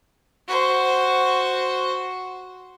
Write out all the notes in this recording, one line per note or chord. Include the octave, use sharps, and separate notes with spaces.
F#4 C5